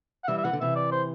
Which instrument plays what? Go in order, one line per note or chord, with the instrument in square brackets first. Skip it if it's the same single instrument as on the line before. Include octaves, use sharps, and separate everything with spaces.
[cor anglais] F#5
[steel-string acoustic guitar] E3 G3 [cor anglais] E5
[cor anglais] E5
[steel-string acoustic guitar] E3 [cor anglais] F#5
[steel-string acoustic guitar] D3
[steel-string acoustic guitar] C3 E3 [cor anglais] E5
[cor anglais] D5
C5